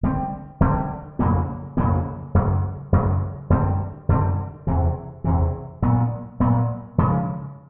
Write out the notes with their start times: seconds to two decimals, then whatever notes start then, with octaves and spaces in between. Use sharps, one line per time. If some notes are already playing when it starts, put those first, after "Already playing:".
0.03 D3 G3 C4
0.61 D3 G3 C4
1.19 F2 C#3 F#3 A#3
1.77 F2 C#3 F#3 A#3
2.34 F#2 C#3 F#3
2.92 F#2 C#3 F#3
3.50 F#2 D3 G3 C4
4.09 F#2 D3 G3 C4
4.67 E2 C3 E3
5.24 E2 C3 E3
5.82 A#2 F#3 B3
6.40 A#2 F#3 B3
6.98 C#3 F3 G#3